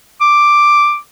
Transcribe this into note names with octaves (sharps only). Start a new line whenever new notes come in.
D6